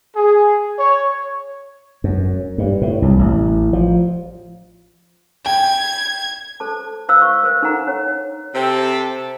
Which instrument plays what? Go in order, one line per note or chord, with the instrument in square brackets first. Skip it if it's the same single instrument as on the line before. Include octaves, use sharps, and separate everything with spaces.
[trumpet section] G#4
C#5
[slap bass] F#2
G2
A2
C2
A1
F3
[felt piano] G5 [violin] G#6
[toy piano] A4 C5 A5
E4 C5 F5 E6
C#6
A#4 C5
D#4 A4 A#4 F#5 A#5
D4 C#5
[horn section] C3 C4 A4